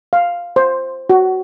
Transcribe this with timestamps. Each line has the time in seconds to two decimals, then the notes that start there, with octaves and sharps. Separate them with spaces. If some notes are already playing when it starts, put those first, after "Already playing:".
0.13 F5
0.56 C5
1.10 F#4